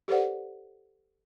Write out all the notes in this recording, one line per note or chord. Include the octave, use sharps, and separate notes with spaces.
G4 A4 B4 C5 D5 F#5